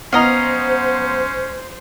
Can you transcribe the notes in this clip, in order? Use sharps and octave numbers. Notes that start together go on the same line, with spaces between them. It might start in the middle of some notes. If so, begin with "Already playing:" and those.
B3 C#4 C5 D#5 F5 A#5